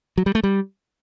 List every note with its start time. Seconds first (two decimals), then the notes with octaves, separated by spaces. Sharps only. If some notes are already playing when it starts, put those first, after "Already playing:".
0.18 F#3
0.26 G3
0.35 A3
0.43 G3